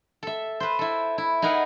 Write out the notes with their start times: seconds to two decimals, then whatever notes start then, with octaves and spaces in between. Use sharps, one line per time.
0.23 A4 E5
0.60 B4 C5
0.79 E4 A4
1.18 E4
1.42 D#4 G#4 A#4 B4 F#5